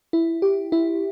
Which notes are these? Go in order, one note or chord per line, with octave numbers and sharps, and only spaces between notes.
E4
G4
E4